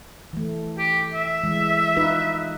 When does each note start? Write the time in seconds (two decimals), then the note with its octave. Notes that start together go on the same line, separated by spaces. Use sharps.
0.33 E3 A3
0.78 G4
1.14 E5
1.43 E3 G#3
1.97 D#4 F4 B4